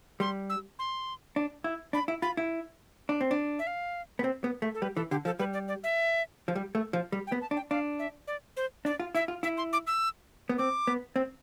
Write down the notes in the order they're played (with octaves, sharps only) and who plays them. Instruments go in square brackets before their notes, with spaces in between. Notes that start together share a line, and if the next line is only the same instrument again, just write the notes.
[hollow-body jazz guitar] G3 [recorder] C6
[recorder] E6
C6
[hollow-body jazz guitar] D4
E4
[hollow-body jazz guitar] D4 [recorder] B5
[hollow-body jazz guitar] E4
[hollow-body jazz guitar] F4 [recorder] B5
[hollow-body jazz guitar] E4
D4
C4
D4
[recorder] E5
F5
[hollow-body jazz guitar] B3
C4
B3
A3
[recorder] A4
[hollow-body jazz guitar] G3 [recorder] B4
[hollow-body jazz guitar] E3 [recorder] A4
[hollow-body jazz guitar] D3 [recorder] G4
[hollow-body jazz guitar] F3 [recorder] A4
[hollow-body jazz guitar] G3 [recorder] B4
[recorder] D5
D5
E5
[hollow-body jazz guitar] F3
G3
A3
F3
G3
[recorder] G5
[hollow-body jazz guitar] B3
[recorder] A5
[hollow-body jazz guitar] D4
[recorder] G5
[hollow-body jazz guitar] D4 [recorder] F5
[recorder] E5
D5
C5
[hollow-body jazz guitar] D4 [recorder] D5
[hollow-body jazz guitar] F4
[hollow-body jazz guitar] E4 [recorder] E5
[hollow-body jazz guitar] F4
[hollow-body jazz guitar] E4 [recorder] E5
[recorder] C6
D6
E6
[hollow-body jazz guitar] B3
[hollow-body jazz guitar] C4 [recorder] D6
[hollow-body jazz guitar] B3
C4